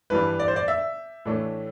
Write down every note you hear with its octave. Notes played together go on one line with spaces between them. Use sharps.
G2 E3 G3 D4 B4
D5
C5
D5
E5
A2 E3 A3 D4